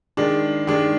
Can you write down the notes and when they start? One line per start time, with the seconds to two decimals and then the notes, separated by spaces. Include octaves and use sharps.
0.17 D#3 G#3 D4
0.67 D#3 G#3 D4